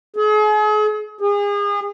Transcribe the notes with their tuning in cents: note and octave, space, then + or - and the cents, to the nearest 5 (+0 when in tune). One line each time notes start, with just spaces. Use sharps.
G#4 +40
G#4 -35